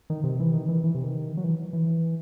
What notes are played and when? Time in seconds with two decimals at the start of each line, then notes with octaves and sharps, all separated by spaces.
0.10 D#3
0.24 C3
0.40 E3
0.54 D#3
0.69 E3
0.84 E3
0.94 C3
1.04 D#3
1.37 F#3
1.44 E3
1.73 E3